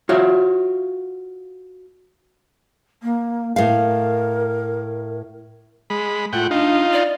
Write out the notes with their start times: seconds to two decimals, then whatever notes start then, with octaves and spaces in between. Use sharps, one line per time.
0.09 F4 F#4 C#5 E5
3.03 A#3
3.56 A2 A#4 F5
5.90 G#3 B5
6.33 A2 F4 F#5 G5
6.51 D4 D#4 F4
6.93 D5